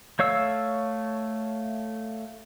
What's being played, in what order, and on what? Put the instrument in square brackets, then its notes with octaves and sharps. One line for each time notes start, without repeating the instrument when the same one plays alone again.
[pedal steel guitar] A3 C#5 F5 E6